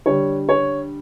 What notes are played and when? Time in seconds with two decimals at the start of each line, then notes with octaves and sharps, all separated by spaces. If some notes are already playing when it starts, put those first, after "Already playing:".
0.06 D3 G3 C#5
0.49 C#5